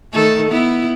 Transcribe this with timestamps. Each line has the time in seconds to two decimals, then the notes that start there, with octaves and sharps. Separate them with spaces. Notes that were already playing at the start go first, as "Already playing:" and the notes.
0.13 D#3 A3 A4
0.49 B3 E4